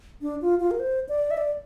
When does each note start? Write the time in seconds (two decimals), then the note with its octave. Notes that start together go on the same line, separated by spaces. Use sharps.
0.22 D4
0.42 F4
0.60 F4
0.71 A#4
0.79 C5
1.09 D5
1.31 E5
1.37 D5